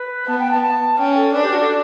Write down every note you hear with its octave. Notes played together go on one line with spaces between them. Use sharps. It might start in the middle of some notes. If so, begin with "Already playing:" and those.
Already playing: B4
B3 A5
G5
A5
A5
C#4 G5
A4
D4 B4
G4
F#4
A4